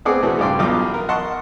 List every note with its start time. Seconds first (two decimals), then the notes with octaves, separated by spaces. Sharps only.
0.05 A3 B3 C4 G#4 D5 F#5
0.23 B2 E3 A3 G#4
0.39 G2 C#3 D5 G5 C6
0.59 B1 E2 F4 D6
0.94 A#4
1.09 D#5 F#5 A5 C6 C#6